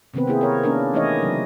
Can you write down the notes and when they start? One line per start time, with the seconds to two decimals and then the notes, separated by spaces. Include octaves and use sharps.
0.14 C3 D#3 B3 C4 B4
0.27 A#3 E4 G#4
0.41 A#4 C#5
0.64 A#3 C#4 D4 A#4
0.94 E3 A3 D#4 E4 C#5 D#5
1.22 C#3 F#3